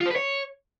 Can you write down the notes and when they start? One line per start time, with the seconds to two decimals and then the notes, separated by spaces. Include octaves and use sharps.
0.01 F4
0.06 C5
0.11 B4
0.16 C#5